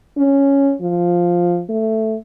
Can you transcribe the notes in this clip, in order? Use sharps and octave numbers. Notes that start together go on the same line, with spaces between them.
C#4
F3
A3